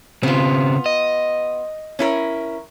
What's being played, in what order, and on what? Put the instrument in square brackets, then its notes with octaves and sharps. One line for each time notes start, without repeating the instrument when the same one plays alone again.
[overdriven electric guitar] C#3 C4 [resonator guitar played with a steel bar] B3 F4
[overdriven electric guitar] D#5
[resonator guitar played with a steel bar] C#4 E4 A#4